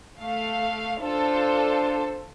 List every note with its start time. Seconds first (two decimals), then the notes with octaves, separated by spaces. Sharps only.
0.20 A3 F5
1.01 D4 F4 A4 C5